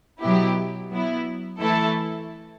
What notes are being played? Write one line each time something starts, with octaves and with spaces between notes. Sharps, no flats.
B2 F#3 B3 E4 G4
F#3 B3 E4
E3 A3 E4 A4